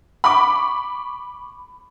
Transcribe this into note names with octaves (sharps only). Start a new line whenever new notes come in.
B5 C#6 D6